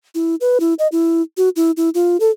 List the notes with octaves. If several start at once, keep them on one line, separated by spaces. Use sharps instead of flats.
E4
B4
E4
D#5
E4
F#4
E4
E4
F4
A4